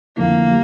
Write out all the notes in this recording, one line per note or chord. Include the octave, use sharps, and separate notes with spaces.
F2 D3 F3 A3 A#3 E4
G3